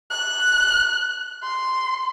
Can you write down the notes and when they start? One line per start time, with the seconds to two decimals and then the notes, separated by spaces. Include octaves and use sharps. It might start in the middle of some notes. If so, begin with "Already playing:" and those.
0.10 F#6
1.43 C6